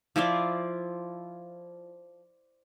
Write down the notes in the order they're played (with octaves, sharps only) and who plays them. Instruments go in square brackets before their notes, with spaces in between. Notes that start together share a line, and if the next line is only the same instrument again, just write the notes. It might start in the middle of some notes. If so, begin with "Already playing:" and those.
[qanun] F3 E4 F4 D5